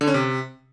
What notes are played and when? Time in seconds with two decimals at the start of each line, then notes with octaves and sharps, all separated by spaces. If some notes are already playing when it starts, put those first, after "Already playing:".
0.01 D3
0.08 C#4
0.14 C3